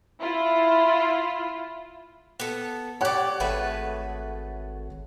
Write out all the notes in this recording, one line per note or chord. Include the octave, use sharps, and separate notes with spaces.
E4 F4
B3 A4
G4 C#5 D5 F#5 F#6
G#1 A3 G#4 B4